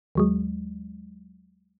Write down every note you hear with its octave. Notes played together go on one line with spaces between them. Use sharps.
D#2 F#3 G#3